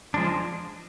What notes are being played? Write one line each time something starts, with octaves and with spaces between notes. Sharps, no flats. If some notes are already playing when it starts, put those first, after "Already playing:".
F3 G#3 D4